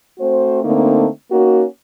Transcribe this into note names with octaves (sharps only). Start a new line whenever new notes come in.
A3 C4 F#4 C5
D3 A3 A#3 C4 D#4
A#3 C#4 D#4 F#4